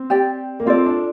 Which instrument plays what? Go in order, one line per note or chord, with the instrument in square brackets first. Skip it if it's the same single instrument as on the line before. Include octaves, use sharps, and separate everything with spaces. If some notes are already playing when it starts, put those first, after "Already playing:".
Already playing: [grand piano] C4
[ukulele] G4 D5 G5
[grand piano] A#3
[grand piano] C4 [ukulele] F4 A4 D5
[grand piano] D4